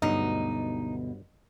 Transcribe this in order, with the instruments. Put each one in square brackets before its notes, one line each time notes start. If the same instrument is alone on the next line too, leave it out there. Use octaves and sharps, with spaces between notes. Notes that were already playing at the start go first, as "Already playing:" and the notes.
[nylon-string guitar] D2 B2 [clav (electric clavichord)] G2 F#3 [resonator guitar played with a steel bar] D#4